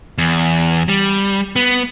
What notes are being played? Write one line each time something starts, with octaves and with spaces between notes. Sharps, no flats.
E2
G3
B3